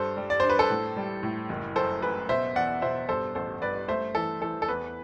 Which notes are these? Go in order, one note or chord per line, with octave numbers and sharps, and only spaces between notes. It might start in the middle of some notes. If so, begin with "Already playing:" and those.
Already playing: G2 A4 C5
G3
D5
D4 C5
B4
A4 C5
A2
G3
A2
F#1
F#2 A4 C5
F#2 B4
B2 C5 E5
E2 D5 F#5
B2 C5 E5
G2 A4 C5
A1 A4 C5
G2 B4 D5
A3 C5 E5
E3 A4
E3 A4
A4
E2 B4